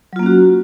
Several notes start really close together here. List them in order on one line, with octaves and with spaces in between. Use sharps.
F#3 F4 A#3 C#4 F#4